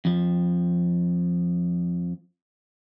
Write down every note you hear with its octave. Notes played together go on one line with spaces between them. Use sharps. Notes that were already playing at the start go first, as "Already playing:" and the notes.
F2 F3